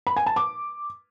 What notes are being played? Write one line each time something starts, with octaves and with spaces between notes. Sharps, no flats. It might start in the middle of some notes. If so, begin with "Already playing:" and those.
B5
G#5
A5
D6